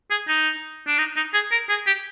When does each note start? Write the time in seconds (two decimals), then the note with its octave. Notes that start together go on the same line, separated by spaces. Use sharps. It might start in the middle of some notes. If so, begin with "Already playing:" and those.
0.10 G#4
0.28 D#4
0.87 D4
0.98 D#4
1.16 D#4
1.34 G#4
1.51 A#4
1.69 G#4
1.86 G4